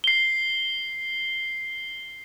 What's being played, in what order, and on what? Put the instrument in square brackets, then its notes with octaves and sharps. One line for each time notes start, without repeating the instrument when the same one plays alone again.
[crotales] C7 G7